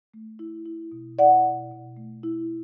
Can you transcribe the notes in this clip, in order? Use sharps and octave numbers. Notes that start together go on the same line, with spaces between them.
A3
E4
E4
B2
E4 D5 F#5
B2
B2
A3
E4